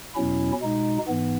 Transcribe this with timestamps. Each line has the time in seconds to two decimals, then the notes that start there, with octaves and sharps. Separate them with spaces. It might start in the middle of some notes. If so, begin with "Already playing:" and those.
0.15 E2 B2 F#3 C#4 E4
0.61 B2 G#3 D#4
1.07 G#2 E3 B3